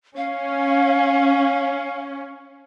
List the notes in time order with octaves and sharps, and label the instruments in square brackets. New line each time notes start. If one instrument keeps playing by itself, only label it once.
[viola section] C#4 [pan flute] F5